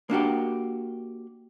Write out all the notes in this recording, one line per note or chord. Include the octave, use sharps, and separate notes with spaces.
A#3 D4 F#4 G4